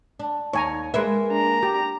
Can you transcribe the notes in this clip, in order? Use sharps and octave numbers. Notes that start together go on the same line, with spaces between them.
D4
D#2 C#5 G#5 A#5
G#3 A#3 B4 E5
D4 A#5
G4